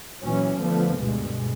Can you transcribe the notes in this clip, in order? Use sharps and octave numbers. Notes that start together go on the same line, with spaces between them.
A#2 E3 F#3 C#4
D3 F3 A3 B3
D2 G2 B2 G#3